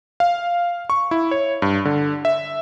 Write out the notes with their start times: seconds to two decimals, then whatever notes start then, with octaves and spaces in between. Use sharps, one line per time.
0.20 F5
0.90 C#6
1.11 E4
1.31 C#5
1.62 G2
1.85 D3
2.25 E5